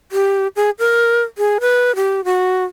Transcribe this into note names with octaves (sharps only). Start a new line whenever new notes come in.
G4
G#4
A#4
G#4
B4
G4
F#4